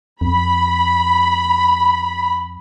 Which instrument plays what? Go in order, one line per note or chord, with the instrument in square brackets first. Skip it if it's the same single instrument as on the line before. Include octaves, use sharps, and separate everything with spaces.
[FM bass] F2 [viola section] B5